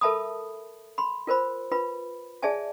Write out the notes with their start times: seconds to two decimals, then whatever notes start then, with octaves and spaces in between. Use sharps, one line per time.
0.01 A4 A#4 E5 A5 B5 D#6
0.98 B5 C6
1.27 F4 A#4 C5 B5
1.71 F4 B4 B5
2.42 G#4 C#5 D5 E5 G#5 A5